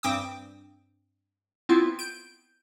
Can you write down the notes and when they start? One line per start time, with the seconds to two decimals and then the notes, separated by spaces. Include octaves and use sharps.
0.03 G2 C4 G5 D6 D#6
1.69 B3 C4 E4 F4
1.99 G6 D7